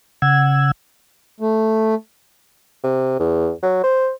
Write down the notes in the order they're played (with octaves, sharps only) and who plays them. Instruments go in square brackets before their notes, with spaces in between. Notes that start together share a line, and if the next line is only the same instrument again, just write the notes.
[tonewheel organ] C#3 F#5 E6 G#6
[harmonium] A3
[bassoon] C3
E2
F#3
C5